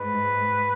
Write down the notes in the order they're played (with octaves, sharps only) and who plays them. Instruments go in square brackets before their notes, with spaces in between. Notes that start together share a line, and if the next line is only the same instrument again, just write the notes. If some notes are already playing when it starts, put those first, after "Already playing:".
Already playing: [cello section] G#2 [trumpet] B4